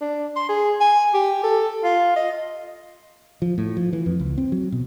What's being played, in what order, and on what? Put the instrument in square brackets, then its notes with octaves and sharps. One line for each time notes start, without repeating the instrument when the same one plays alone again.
[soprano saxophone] D4
C6
G#4
G#5
G4
A4
F4
D#5
[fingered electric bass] F3
A2
F3
E3
F2
C#2
C4
F#3
B2